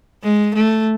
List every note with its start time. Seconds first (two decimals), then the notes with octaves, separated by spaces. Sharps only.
0.24 G#3
0.55 A3